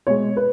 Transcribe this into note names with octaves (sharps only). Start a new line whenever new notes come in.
B2 G#3 C#5
B4